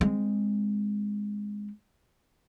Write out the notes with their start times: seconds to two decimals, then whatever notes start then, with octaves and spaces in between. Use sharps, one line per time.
0.01 G#3 C4